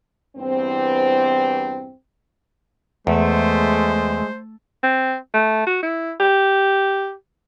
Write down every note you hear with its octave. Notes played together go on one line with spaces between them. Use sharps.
E2 G2 E3 C4
E2 G#3 A3 C5
C4
A3
F#4
E4
G4